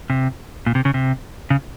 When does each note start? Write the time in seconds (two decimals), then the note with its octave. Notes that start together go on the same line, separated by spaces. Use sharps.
0.10 C3
0.66 A#2
0.75 C3
0.85 C#3
0.94 C3
1.50 C#3